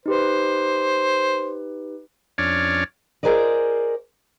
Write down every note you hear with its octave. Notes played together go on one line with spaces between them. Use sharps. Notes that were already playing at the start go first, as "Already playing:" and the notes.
D#4 G4 B4 C5
F2 C#4 D4 C#5 D5 F6
F4 G#4 A#4 C5 D5 D#5